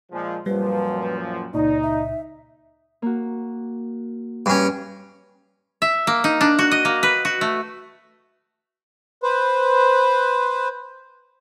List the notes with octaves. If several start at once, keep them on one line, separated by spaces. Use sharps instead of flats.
A#2 F3 G#3
F#2 A#2 F3 G3 B4
C#2 A#2 D#4 D5
E5
A#3 F#4
G2 C#4
E5
A#3
D#4
D4
F#4
D#5
A#3
B4
F#4
A3
B4 C5